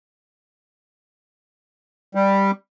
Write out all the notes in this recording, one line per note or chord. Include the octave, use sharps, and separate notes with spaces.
G3